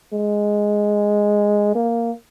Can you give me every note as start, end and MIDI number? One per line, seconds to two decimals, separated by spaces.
0.13 1.74 56
1.75 2.12 58